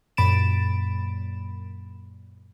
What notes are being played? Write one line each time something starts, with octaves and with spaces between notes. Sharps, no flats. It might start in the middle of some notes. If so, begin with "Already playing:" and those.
F#2 A#2 B5 A6 D7 E7